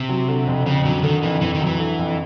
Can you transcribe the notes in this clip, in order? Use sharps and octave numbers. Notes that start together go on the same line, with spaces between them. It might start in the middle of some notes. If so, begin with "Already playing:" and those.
Already playing: C3
F#3
D3
F2
F2 C#3
D3 F#3
D3 D#3
F2 E3
F2 E3
D#3
F#3
E3
D3
F2